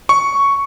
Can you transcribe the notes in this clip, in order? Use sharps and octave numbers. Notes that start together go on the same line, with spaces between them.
C#6